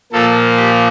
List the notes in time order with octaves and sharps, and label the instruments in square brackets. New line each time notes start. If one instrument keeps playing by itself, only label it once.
[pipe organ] A#2 F3 A#3 A4
G4